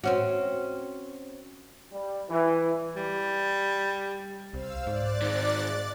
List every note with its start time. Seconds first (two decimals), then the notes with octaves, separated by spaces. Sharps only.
0.04 C4 C#4 F#4
1.92 G3
2.30 E3
2.96 G3
4.54 C2 C5 F5 E6
4.87 G#2 D5 F#6 A6
5.22 D#3 G#3